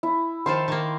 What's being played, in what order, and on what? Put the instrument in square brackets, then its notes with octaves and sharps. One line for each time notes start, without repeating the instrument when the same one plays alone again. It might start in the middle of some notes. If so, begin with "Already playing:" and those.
[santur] E4
[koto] D#3 F3 A4 [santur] C6
[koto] D#3 A#3